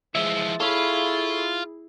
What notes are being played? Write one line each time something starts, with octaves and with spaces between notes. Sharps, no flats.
E3 F3 G#3 E5
E4 F4 G#4 A4 C#5 B5